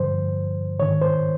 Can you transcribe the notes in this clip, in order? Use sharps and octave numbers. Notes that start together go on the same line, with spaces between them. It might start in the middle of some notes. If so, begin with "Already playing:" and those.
Already playing: G2 D3 F3 C5
G#2 D#3 C#5
C5